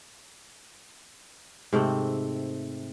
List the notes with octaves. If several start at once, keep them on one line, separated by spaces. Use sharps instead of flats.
G#2 C3 A3 C4